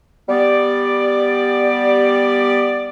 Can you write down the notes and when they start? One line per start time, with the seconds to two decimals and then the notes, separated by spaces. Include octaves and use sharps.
0.29 G3 B3 D5